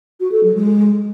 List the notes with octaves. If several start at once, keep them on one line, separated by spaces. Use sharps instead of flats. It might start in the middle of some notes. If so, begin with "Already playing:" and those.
F#4
A4
F#3
G#3